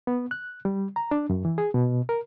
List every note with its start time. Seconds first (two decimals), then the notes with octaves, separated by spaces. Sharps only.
0.07 B3
0.31 F#6
0.65 G3
0.96 A#5
1.11 D4
1.30 F#2
1.45 E3
1.58 G#4
1.74 B2
2.09 A#4